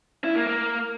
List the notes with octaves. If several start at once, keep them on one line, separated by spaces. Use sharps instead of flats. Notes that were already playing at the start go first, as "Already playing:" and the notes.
E4
A#3
A#3